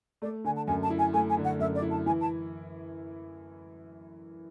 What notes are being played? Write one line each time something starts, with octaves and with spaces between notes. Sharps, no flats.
A3 D5
D3 G#5
A5
F#2 G#5
A5
E4
G#5
A3 G#5
G#5
D3
F#5
F#2 E5
D5
E4
A5
E3 G#5
A5